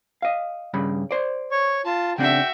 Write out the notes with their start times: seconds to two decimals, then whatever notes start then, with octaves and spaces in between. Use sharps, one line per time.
0.22 D#5 F5
0.74 G2 C#3 B5
1.11 C5 D5
1.52 C#5 C#6
1.86 F4 A5
2.18 C#3 C4 D4 F#4 E5 G5